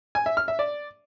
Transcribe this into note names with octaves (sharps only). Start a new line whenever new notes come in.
G#5
E5
F6
E5
D5